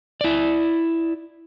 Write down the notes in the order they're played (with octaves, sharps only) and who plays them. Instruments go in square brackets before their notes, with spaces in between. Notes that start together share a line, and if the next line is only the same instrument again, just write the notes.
[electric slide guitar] E4 D5